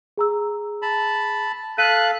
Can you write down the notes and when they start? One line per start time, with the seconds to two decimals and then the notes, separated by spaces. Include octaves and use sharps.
0.18 G#4 A#5 E6
0.82 A5 B5
1.78 A4 F5 F#6 B6 D#7